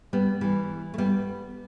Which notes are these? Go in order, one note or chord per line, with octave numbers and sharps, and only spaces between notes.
G3 B3
E3 G3
A3
G3 B3